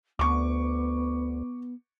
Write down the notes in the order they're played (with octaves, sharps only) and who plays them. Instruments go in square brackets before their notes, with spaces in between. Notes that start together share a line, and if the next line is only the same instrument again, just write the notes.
[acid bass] D2 [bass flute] B3 [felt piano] C#6 D6